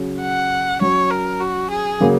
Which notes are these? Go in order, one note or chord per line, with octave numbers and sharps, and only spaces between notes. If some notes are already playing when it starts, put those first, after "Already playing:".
Already playing: C#3 F#3 C#4
F#5
F#3 C#4 C#5
A#4
F#4
G#4
C#3 F#3 A#3